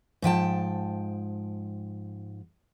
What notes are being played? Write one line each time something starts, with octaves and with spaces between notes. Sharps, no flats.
G#2 F3 G5 A5